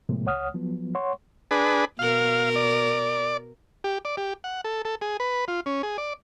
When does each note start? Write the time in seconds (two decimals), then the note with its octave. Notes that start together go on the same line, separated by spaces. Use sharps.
0.09 A2 C3 F3 G#3 A#3
0.26 C#2 C#5 F#5 D#6 F6
0.54 F3 F#3 B3
0.95 C#5 F#5 C6 C#6
1.51 D4 G#4 B4
1.99 B2 A#4 F5
2.56 D5
3.84 G4
4.05 D5
4.17 G4
4.44 F#5
4.64 A4
4.85 A4
5.01 G#4
5.20 B4
5.48 F4
5.66 C#4
5.83 G#4
5.98 D5